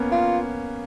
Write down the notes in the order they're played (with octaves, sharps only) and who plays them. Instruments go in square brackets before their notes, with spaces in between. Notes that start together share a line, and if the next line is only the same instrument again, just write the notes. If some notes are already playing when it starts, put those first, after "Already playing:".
Already playing: [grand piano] A#3 B3 C#4
[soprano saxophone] F4